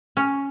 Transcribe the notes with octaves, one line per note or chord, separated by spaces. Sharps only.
C#4